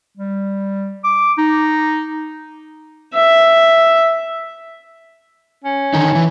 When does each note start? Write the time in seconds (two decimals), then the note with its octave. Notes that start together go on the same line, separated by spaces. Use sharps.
0.17 G3
1.04 D6
1.38 D#4
3.14 E5
5.64 C#4
5.94 D3 D#3 D#4
6.15 E3